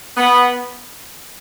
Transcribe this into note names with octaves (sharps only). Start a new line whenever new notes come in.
B3